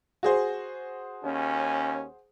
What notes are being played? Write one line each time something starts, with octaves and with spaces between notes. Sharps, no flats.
F#4 G#4 C5
D#2 C#4